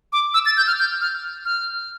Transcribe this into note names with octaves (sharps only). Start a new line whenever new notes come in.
D6
E6
A6
G6
F6
G6
F6
F6